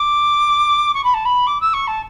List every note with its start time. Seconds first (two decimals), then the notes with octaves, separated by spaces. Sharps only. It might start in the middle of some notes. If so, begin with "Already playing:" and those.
Already playing: D6
0.94 C#6
1.04 B5
1.14 A5
1.25 B5
1.46 D6
1.60 E6
1.73 C#6
1.87 A5